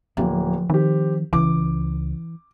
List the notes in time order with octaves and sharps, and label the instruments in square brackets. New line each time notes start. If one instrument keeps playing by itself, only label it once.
[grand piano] D1 A#3 [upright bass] F3
[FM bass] D#3 [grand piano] C4 G4
[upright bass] C#2 [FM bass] E3 [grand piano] D6